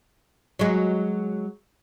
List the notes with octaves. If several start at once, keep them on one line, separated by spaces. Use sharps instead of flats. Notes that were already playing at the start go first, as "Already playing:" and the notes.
F#3 G#3